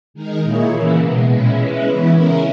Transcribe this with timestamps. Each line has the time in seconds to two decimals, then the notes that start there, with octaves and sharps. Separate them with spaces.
0.14 D#3 G#3 D#4 A#4
0.43 A#2 A#3 E4 G#4 C#5
0.72 C#3 E3 A#3 E4
1.01 B2 G#3 B3
1.29 A#2 G#3 C#4 E4
1.58 G#3 C#4 E4 B4
1.86 C#3 E3 B3 E4
2.15 C#3 G#3 C#4 E4 A#4